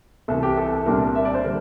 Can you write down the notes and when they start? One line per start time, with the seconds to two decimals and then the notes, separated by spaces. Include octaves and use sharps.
0.28 C2 C3 E3 A4
0.43 G4
0.57 A4
0.86 C2 A#2 G3 D4 A#4
1.01 A#4
1.15 E5
1.25 D5
1.34 C5
1.44 D3 G3 A#4